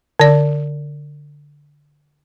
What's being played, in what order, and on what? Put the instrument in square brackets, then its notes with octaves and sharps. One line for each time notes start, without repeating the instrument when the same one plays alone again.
[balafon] D3 D5